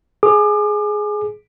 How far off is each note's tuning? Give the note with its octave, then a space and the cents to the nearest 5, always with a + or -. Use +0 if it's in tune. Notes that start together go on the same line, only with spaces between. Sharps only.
G#4 +15 D6 +35